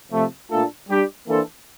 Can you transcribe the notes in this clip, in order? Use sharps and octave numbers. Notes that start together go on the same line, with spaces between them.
C3 F3 A3
A#2 A3 D4 F4 A4
G3 D4 G4
E3 A#3 D4 A4 C5